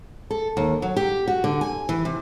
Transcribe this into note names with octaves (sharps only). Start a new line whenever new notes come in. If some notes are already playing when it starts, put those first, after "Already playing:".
A4
D#2
F#3
G4
F#4
D3
G#5
E3
C3